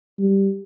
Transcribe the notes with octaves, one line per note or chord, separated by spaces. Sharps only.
G3